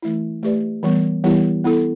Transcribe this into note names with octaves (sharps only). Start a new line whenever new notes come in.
E3 A3 E4
A3 G4 B4 D5
E3 G3 B3
E3 G3 B3 E4 G4
B3 E4 A4